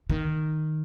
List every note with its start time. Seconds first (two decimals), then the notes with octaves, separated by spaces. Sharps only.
0.10 D#3